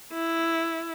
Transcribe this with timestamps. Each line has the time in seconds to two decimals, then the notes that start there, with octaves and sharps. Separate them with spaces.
0.13 E4